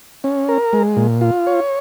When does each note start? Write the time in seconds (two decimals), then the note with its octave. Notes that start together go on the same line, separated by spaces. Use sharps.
0.24 C#4
0.49 A#4
0.73 G#3
0.97 A#2
1.21 F4
1.47 C#5